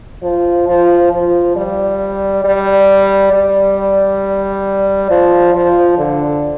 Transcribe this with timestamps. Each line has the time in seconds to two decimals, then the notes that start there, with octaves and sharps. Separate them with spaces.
0.23 F3
0.68 F3
1.12 F3
1.56 G3
2.44 G3
3.33 G3
5.10 F3
5.54 F3
5.98 D3